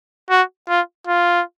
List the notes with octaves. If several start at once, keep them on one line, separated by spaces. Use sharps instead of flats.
F#4
F4
F4